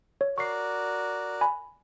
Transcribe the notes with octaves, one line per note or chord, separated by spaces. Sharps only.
C#5
F#4 A#4 D5 C#6 C7
G#5 B5